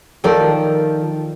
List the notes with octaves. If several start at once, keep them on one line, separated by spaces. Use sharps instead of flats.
D#3 F3 A4 A#4 D5